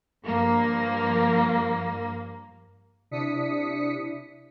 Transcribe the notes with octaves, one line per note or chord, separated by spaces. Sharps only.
G2 F3 A#3
C3 D4 E4 D#6 B6 C#7